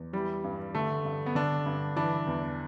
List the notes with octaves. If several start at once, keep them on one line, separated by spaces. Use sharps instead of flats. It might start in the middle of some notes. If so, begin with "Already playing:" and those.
Already playing: E2
E3 G3
G2
D3 A3
G2
B3
D3 D4
G2
E3 D4
E2